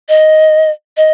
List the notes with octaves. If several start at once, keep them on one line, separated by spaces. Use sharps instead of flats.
D#5
D#5